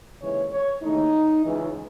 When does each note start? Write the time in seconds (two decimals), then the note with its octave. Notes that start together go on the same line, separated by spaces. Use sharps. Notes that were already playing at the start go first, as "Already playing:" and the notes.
0.20 D#2 C#3 E3 G#3 C#5
0.52 C#5
0.83 D#2 C#3 E3 A3 D#4
1.46 C#2 C#3 E3